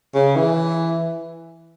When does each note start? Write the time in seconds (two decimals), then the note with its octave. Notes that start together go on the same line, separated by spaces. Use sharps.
0.14 C#3
0.36 E3